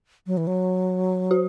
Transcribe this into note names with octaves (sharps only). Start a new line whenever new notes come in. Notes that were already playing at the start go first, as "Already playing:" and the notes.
F#3
E3
F#3
F#4